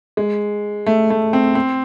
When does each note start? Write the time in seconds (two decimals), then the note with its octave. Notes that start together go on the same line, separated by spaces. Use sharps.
0.17 G#3
0.86 A3
1.10 A3
1.33 C4
1.55 C4